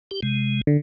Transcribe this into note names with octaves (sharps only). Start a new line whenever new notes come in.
G4
C3 G#3
D3